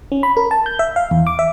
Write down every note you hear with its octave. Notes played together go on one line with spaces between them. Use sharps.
C#4
B5
A#4
A5
G6
E5
F5
E2
D6
E5